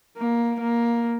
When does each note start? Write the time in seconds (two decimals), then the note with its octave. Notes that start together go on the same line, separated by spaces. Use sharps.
0.17 A#3
0.61 A#3